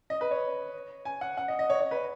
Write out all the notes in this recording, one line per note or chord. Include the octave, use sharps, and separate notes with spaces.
D#5
B4
C#5
G#5
F#5
F#5
D#5
D#5
C#5
C#5
B4